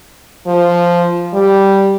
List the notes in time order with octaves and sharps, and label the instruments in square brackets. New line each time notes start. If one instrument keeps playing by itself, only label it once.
[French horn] F3
G3